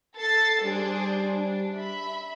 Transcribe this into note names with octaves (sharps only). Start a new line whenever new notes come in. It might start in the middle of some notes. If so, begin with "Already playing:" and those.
A4 A6 C7
G3 D4 G#4 C5
D4
E5 B5